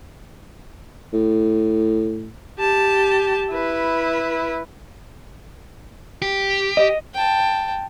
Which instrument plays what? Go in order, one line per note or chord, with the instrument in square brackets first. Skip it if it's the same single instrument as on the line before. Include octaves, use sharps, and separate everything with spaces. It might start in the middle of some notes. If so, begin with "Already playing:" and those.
[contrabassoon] A2
[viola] G4 A5
E4 B4
[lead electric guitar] G4
[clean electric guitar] D#5
[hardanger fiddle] G5 A5